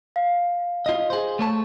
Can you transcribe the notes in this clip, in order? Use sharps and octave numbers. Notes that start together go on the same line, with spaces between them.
F5
F4 D#5
G#4 C5
A3 C#5 A5